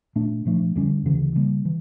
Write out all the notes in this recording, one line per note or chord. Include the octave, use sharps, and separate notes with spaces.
A#2 A3 D4
A#2 F3 A3 D4
F2 D3 G3 C#4
D2 C#3 E3
C#3 G3 A#3
E3